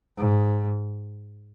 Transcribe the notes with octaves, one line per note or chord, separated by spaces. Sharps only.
G#2